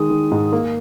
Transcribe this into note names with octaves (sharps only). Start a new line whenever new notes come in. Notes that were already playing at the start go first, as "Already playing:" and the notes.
Already playing: D#3 G#3 D#6
D#3
G#2
A#3